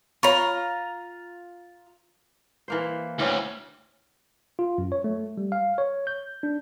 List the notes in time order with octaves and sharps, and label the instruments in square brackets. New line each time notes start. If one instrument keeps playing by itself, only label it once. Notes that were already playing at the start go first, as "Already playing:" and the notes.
[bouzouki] F4 A#5 [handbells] C#5 B5 C#6
[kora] E3 A#3 C5
[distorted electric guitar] D2 [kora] E3 C4 C#4
[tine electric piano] F4
F#2
C#5
A3
G3
F5
C#5
G6
D4